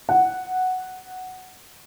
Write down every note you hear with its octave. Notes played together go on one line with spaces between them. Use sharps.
F#5